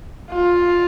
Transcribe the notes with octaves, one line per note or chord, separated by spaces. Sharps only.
F4